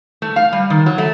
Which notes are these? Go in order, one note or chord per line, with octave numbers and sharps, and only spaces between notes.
A3
F5
G3
D#3
F#3
A3